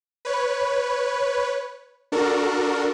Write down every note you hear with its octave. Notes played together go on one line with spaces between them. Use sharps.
B4 C#5
D4 F#4 A4 A#4